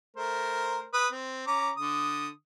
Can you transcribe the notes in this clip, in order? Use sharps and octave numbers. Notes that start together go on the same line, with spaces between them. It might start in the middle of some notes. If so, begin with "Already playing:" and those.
A3 A#4 C5
B4 D#6
C4
C#4 A#5 D6
D3 D#6